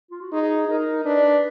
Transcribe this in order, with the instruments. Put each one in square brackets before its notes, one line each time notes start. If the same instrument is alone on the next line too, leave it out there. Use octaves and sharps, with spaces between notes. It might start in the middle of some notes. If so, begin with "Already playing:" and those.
[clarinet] F4
F#4
[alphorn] D#4 [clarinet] G#4
[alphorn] D#4 [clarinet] A#4
[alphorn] D4 [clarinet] B4